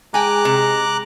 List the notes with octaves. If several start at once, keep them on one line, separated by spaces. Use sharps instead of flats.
G#3 G5 G#5 A#5 D6 F#6
C3